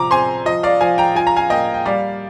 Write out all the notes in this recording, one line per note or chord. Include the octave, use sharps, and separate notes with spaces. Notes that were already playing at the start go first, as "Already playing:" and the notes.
Already playing: C3 F3 A#5 D6
C4 G#5 C6
F3 D#5
D5 F5
F3 F5 G#5
G5 A#5
F4 G#5
A#5
F5 G#5
A#3 D#5 G5
G5
G3 D5 F5